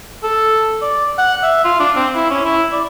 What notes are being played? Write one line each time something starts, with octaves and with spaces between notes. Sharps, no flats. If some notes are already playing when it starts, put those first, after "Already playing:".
A4
D5
F#5
E5
F4
D4
C4
E4
C#4
E4
D5